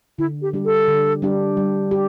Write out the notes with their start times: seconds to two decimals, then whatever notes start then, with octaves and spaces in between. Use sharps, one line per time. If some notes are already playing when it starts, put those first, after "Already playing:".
0.19 D3 E4
0.42 G4
0.53 G3 D4 G4
0.65 A4
0.88 D3
1.22 G3 D4 G4
1.57 G3
1.91 G4